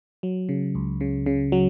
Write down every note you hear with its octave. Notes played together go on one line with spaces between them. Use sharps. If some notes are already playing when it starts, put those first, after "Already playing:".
F#3
C#3
C#2
C#3
C#3
F#3